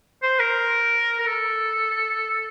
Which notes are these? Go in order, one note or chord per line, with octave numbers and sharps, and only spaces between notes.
C5
A#4
A#4
A4